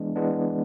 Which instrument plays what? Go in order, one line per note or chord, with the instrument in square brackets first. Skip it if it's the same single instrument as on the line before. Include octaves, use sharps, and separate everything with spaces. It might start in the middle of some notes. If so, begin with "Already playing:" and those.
Already playing: [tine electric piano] E3 G#3 B3 D4
E3 G#3 B3 D4